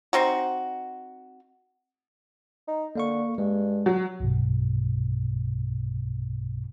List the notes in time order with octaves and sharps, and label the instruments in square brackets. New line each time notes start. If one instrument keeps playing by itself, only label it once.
[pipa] C4 D#4 F#4
[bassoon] D#4
[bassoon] D3 [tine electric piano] A#3 F5 C#6
[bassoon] G2 [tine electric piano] G#3
[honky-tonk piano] F#3
[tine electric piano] B1 G2 B2